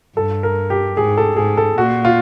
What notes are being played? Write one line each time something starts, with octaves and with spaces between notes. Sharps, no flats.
G2 A4
A#4
G4
G#2 G#4
A4
G#2 G#4
A4
A#2 F#4
F4